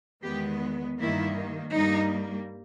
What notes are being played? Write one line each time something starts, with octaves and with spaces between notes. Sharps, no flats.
E2 D#3 G#3 B3 G4
G2 D#3 A#3 E4
G2 G3 A#3 D#4